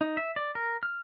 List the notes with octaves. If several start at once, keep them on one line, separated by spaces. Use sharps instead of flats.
D#4
E5
D5
A#4
F6